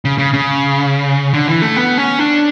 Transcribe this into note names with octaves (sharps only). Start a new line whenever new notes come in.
C#3
C#3
C#3
D3
E3
A3
B3
C#4
D4